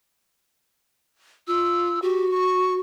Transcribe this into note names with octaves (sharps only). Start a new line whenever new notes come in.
F4 E6
F#4 G4
C#6